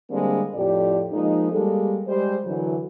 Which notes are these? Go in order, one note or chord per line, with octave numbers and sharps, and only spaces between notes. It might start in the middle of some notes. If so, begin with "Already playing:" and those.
D3 G3 G#3 A#3 C4 D4
F2 A2 G4 A4 D5
F3 G#3 A#3 D#4
G3 G#3 A#3 A4
G3 G#3 C5
F#2 D3 E3 F#3